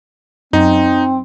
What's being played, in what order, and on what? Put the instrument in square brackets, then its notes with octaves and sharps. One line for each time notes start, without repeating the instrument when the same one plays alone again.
[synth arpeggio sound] F#2 [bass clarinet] C4 [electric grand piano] D#4